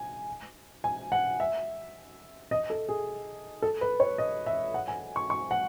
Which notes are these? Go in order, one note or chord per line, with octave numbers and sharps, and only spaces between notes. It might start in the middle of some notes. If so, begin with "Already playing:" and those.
Already playing: G#5
G#5
F#5
E5
D#5
A4
G#4
A4
B4
C#5
D#5
E5
F#5
G#5
C#6
C#6
F#5